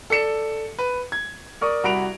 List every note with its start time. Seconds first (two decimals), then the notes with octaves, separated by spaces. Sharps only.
0.10 A4 D5 C#7 E7
0.79 B4
1.12 G#6
1.61 A#4 D5 C#6 D#6
1.84 C2 F#4 B5 D7 F7